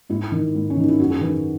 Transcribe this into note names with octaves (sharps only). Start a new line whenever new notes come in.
G#2 E4
D#3
G#2
C#4
D#3 D#4
E4
F#2 F#4
G#4
D#3 B4